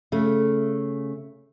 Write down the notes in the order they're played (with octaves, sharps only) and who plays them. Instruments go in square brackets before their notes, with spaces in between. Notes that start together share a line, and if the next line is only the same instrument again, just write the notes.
[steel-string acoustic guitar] C#3 A3